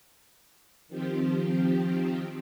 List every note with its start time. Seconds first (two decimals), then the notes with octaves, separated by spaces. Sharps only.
0.88 D#3 F3 C4 G4